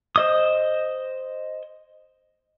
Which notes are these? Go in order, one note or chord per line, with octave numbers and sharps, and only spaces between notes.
C5 D#5 D#6